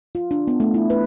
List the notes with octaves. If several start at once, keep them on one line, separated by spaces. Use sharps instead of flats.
F4
D4
B3
A3
E4
B4